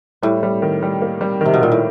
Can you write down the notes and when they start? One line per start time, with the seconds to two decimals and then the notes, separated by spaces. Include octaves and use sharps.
0.23 A2 G3
0.43 G3
0.62 D#3
0.83 G3
1.02 A#3
1.21 G3
1.41 C3 D#3
1.54 B2
1.60 A#2 D#3
1.72 A2